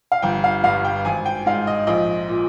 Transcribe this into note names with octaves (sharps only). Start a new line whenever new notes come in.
F5
G1 G5
F5
G2 F5
G5
G#1 G#5
G5
G#2 F5
D#5
A#1 D#5
A#2